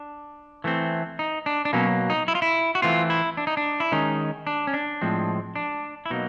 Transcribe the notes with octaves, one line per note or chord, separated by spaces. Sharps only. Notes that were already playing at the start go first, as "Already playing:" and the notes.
Already playing: D4
E3 A3 C4
D#4
D4
D4
B2 F#3 A#3 C#4
D#4
E4
F4
E4
F#4
E3 A3 C4 F4
E4
D4
D#4
D4
E4
D#3 G#3 C#4 D#4
D4
C#4
D4
A2 F3 G#3 C4
D4
E4
B2 F#3 A#3 D#4